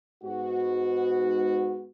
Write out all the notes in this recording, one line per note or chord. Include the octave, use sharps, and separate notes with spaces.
G#2 B3 F#4